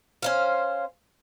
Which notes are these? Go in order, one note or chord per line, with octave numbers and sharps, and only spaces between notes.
C#4 C5 F5